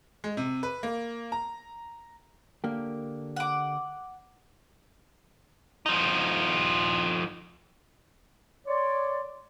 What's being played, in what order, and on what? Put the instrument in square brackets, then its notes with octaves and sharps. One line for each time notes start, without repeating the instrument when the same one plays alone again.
[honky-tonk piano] G#3
C3
B4
A#3
A#5
[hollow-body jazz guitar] D3 A#3 G4
[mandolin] F#5 D6
[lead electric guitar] F3 D#4
[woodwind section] C#5 D5 [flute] C6